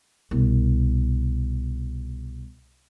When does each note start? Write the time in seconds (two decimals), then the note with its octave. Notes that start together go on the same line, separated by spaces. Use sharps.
0.31 C2 B2